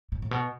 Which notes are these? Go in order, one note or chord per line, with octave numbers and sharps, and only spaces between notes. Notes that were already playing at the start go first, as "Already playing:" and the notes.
A2
A2
B2